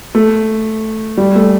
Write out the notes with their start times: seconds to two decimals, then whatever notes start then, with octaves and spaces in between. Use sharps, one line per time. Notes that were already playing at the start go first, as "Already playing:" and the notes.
0.15 A3
1.17 G3
1.35 A3